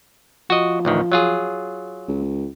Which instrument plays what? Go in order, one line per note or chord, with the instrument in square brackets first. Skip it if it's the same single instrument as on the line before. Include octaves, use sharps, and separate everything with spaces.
[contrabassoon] F3 [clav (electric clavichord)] F#4 D#5
[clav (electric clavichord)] A1 D2 D#3
F#3 F4 G#4
[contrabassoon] C#2